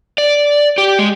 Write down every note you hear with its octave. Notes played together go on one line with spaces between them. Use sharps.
D5
G4
G#3